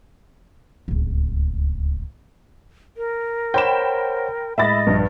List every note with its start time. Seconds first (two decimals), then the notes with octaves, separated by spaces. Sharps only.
0.88 D1 C#2
2.97 A#4
3.54 C5 C#5 F#5 G5 B5 E7
4.58 A2 G#3 D#5 E5 B5 A6
4.87 A#1 G2